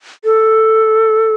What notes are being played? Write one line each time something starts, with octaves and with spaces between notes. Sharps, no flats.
A4